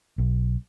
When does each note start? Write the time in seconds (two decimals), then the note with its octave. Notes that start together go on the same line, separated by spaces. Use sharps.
0.18 B1